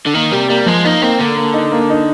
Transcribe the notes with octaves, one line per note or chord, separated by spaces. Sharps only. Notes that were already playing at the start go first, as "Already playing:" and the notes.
D3
D#3 A#3
C3 G3
G3 A#3
F3 G#3
A#3 D#4
A#3 C4
D3 A#3
A#3
D#4
A#3
D#4